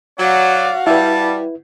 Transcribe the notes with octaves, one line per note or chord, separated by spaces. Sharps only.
F#3 F#4 D5 F5
G3 E4 B4 A5